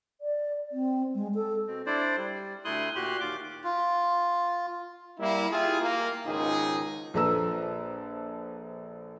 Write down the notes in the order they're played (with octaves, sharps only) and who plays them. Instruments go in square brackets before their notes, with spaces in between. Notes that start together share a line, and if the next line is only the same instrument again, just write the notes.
[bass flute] D5
C4
G#3
A4
[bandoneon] B2 C4
D4 E4 C5 D5
G3
D2 A3 E4 C6 D#6 F#6
A#2 F#4 G4 C6 F#6
D#2 F4 D6
[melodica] F4
[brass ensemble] G3 A#3 E4
E4 F4 G4 G#4
A#3
C#2 G#2 D#3 D#4 G#4
[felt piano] A#1 F3 A4 B4 A#5 E6